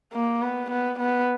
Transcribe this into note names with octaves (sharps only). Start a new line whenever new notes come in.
A#3
B3
B3
B3